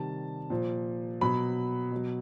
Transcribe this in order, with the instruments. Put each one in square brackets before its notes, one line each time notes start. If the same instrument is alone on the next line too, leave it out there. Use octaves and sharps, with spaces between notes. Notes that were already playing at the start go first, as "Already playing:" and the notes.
Already playing: [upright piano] C3 D#3 G3 A5
A#2 F3
B2 F#3 B5
B2 F#3